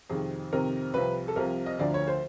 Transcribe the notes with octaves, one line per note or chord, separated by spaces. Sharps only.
F2 C3 D#3 G#4
F2 C3 D#3 A#4
C2 C3 F3 B4
A4
C2 C3 F3 A#4
D#5
D2 D3 F3 D5
C#5
C5